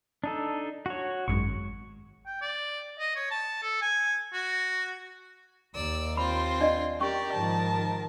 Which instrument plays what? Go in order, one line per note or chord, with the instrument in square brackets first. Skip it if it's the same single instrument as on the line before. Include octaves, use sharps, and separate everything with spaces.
[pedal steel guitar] D4 D#4 A4
F#4 C#5
[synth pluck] G#1 F#2 G#3 [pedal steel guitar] C#6
[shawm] G5
D5
D#5
C#5
A5
A4
G#5
F#4
[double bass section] D#2 [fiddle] D5 E6
[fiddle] C4 F4 [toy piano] B5
[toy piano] D4 D5 D#5
[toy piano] C#4 C#6 [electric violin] G4 D5 [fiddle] A#4
[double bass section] G#2 D#3 F3 [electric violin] A5